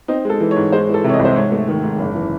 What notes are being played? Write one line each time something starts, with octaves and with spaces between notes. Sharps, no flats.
C4 D#4
G#3 A4
E3
C#5
G#2
G#3 C5
E3
A4
C3
C#5
D#5
C2
C5
G#2 C#5
A3
D#3
G#2
F#1
E3